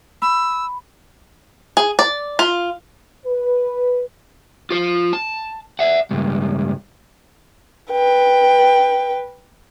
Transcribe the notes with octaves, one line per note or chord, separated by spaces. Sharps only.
B5 E6
G#4
D5
F4
B4
F4 C5
A5
E5 F#5
C#2 G2
B4 G5